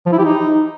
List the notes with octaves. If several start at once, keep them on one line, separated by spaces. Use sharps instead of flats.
F3
E4
G4
D#4